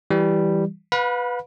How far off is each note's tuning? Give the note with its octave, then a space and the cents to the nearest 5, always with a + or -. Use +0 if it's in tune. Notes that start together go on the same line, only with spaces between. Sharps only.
E3 +0 G3 +0
B4 +0 F5 +45 B5 -25